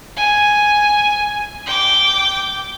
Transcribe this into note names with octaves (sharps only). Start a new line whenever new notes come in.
G#5
G5 D6